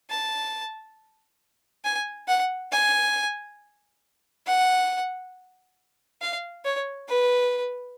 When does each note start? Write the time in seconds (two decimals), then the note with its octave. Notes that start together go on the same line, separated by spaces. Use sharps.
0.10 A5
1.84 G#5
2.28 F#5
2.72 G#5
4.46 F#5
6.21 F5
6.65 C#5
7.08 B4